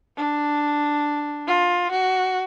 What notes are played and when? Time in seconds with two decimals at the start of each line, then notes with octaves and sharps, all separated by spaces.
0.17 D4
1.47 F4
1.92 F#4